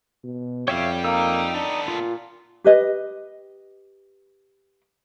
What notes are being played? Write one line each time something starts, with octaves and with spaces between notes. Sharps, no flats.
B2
F2 C#5 D5 E5 F5 G5
A#3 D#4 E6
B3 D4 A4
A#2 F4
G4 B4 D#5